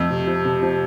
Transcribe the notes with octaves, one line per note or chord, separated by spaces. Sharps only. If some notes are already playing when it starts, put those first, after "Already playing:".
Already playing: F2 A3
C3
F3
C3
F3